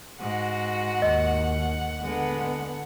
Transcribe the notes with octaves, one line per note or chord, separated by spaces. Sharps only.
G#2 F#4 F#5
D#2 D#5
D3 G#3 B3